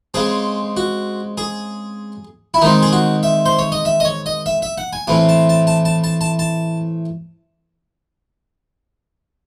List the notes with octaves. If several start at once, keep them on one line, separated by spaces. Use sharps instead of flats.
C#3 G#3 C4 G#4
F#4
G#4
E4
D#3 G#3 C4 D#4
G#4
F#4
E5
C5
C#5
D#5
E5
D#5
C#5
D#5
E5
E5
F#5
G#5
A2 E3 C4 G#5
A5
A5
A5
A5
A5
A5
A5